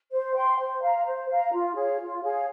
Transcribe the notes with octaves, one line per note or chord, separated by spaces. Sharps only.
C5
G5 C6
C5
F5 A#5
C5
F5 A#5
F4
G#4 C#5 F5
F4
G#4 C#5 F5